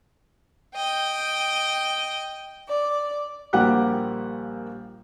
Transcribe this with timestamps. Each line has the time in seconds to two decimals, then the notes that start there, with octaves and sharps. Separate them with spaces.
0.75 D#5 G5
2.69 D5
3.53 A#1 G3 A#3 G4 F#5 F#6